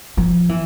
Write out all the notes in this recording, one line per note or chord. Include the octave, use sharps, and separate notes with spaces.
F3
E3